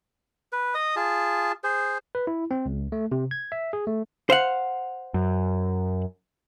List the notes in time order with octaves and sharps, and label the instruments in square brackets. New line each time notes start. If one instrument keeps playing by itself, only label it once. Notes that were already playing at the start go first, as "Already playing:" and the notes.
[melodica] B4
D#5 D#6
F4 G#4 A5
G#4 C5
[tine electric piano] B4
E4
C4
C#2
A3
C3
G#6
E5
G#4
A3
[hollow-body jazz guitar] C5 F5 F#5
[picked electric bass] F#2